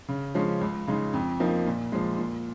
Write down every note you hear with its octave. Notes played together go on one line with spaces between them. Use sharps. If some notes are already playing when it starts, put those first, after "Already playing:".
C#3
F3 G#3 C#4
C#2
C#3 G#3 D#4
F2
F3 A#3 D#4
A#2
F3 G#3
A#2